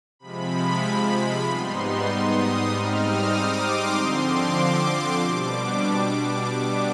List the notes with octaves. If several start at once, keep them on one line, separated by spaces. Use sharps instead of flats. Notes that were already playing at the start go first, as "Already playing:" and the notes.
C3 F3 G#3 B5
G#2 G3 B3 D#4 C6
D#6
G#2 G3 C4 D#4 F6
D#6
D6
C6
D3 F3 C4 C6
D6
B2 G3 D4 D6
B2 G3 B3 D4